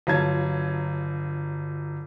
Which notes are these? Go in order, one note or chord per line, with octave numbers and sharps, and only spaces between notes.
G1 F#3 F4 C#5 A5 G#6